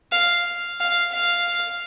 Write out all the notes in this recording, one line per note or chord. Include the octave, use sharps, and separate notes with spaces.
F5
F5
F5